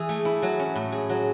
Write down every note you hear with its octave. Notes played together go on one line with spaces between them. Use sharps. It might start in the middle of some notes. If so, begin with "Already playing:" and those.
Already playing: E3 G#4
A3
E4
F#3
C#4
A2
G#4
F#3